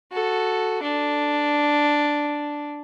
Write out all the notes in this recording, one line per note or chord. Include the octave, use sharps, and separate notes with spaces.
F#4 A4
D4